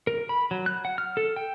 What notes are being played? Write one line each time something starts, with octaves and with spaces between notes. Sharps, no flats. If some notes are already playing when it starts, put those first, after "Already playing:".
A#4
B5
F#3
F#6
F#5
F6
A4
G5